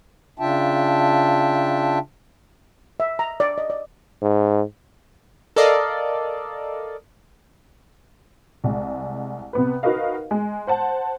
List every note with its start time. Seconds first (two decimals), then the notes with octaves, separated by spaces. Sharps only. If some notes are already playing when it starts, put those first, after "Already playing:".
0.40 C#3 D4 F4 E5 G5 A5
3.00 E5
3.19 A#5
3.40 D5
3.58 D#5
3.70 D5
4.22 G#2
5.56 A4 A#4 D5 D#5 F5
8.64 C2 G#3
9.53 C3 B3 B4
9.83 D#4 F#4 A#4 B4 D#5 F5
10.31 G#3
10.67 C5 F#5 A5